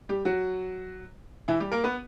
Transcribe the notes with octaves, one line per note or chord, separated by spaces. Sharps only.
G3 G4
F#3 F#4
E3 E4
G3 G4
A#3 A#4
B3 B4